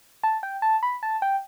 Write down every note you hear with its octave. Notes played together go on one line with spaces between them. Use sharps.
A5
G5
A5
B5
A5
G5